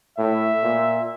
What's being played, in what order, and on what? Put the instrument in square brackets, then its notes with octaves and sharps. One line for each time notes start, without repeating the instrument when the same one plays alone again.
[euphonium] A2 [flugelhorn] E5
[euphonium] A#2